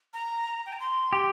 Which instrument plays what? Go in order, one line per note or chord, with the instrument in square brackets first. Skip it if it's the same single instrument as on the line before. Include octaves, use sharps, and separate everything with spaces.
[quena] A#5
G5
A#5
C6
[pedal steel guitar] G4